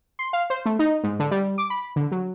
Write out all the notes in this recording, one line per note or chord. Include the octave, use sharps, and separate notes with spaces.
C6
F5
C5
A3
D#4
G#2
D3
G3
D6
B5
D3
F#3